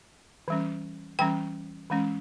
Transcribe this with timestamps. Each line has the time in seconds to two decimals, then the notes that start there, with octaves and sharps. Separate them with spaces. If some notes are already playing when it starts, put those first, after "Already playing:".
0.48 E3 G3 C#4
1.19 E3 G3 C#4 G5
1.90 E3 G#3 C#4